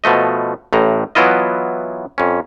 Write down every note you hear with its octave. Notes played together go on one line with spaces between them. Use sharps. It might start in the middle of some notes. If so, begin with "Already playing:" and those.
B2 F3 A3 D#5
A1 A2 A#5
E3 F#3 B3 E4 F4 D#5
F2 C#4